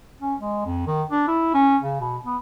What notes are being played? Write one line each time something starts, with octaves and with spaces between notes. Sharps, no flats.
C#4
G#3
F2
D#3
D4
E4
C#4
C#3
B2
B3